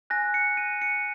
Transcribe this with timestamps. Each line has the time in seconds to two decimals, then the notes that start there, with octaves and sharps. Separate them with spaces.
0.10 G#5 F#6 A#6
0.34 C#7
0.57 D#7
0.82 C#7